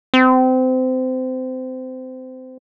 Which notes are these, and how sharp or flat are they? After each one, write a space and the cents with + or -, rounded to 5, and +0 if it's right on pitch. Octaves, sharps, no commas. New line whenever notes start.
C4 -25